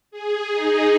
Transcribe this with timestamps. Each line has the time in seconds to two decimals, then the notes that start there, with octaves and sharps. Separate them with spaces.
0.11 G#4
0.51 D#4